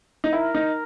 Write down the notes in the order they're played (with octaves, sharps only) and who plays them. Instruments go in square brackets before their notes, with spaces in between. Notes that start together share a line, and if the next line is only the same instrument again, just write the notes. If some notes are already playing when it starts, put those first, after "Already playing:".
[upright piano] D#4
[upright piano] E4 [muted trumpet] A#4
[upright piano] D#4